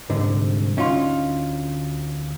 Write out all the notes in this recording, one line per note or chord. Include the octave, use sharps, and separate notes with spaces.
C2 G#2 D3
D2 C#4 D#4 F4 C6